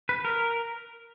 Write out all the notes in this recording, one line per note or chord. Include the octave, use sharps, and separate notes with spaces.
B4
A#4